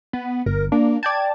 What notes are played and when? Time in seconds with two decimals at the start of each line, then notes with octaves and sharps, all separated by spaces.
0.13 B3
0.46 G1 A#4
0.72 A#3 D4
1.03 D5 G5 A5 G#6